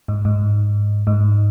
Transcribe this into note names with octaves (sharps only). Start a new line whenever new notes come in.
G#2
G#2
G#2